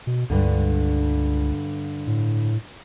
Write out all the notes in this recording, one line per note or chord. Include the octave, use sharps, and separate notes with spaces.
B2
C#2 G2 D3
A2